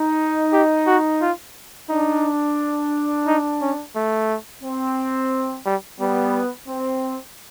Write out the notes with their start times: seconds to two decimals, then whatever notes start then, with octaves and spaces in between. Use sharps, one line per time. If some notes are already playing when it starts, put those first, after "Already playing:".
Already playing: D#4
0.52 G4
0.87 F#4
1.21 F4
1.89 D4 D#4
3.27 D#4
3.61 C#4
3.95 A3
4.63 C4
5.66 G3
6.00 G3 B3
6.68 C4